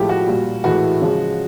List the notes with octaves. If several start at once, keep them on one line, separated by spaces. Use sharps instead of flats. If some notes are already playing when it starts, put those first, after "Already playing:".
Already playing: A2 F3 G#3 G4
F#4
A#2 G3
A2 E3 G#3 F#4
C#3 F3 G#3